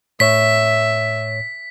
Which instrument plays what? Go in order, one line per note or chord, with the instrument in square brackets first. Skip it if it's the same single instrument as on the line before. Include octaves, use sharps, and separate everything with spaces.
[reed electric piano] A2 C#5 [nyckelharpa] E5 [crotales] B6